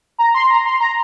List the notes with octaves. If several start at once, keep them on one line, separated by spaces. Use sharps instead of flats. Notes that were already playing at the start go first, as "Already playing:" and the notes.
A#5
C6
A#5
C6
A#5